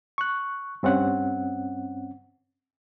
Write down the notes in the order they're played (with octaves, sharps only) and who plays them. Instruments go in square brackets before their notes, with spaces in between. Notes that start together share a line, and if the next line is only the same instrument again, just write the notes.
[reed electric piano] C#6 F#6
G2 C4 C#4 F#5